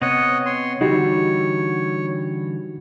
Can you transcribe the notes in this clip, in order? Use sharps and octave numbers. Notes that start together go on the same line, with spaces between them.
C3 B3 C#5 D#5 F#5
C#5 C6
D3 E3 G3 D#4 F#4 G4 C#5